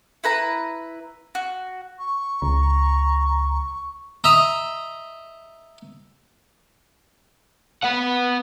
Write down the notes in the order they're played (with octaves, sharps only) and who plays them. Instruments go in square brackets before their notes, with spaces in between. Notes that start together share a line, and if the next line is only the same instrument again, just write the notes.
[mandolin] E4 B4 A#5
F#4
[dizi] C#6
[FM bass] C#2 [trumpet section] A#5
[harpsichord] D#5 E5 A#5
[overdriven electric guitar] B4 F#5